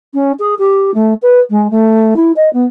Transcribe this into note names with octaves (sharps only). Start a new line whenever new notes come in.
C#4
G#4
G4
A3
B4
G#3
A3
E4
D#5
B3